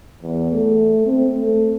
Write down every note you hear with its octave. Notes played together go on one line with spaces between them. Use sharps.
E2
A3
C4
A3